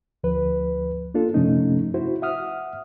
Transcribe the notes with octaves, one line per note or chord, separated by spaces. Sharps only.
D2 F3 B4
A#3 D4 F4 A4
F#2 C3 F3 A3 C#4 D#4
E4 F#4 C5
E5 F#5 D#6 F6